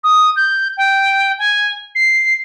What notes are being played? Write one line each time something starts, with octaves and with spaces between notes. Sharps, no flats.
D#6
G6
G5
G#5
C7